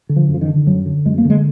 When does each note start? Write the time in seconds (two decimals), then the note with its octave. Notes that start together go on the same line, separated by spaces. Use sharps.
0.09 D3
0.16 F3
0.29 F#2
0.34 F3
0.41 D#3
0.48 D3
0.67 F#2 F#3
0.86 D3
1.05 F#2 G#3
1.18 A#3
1.25 D3
1.30 G#3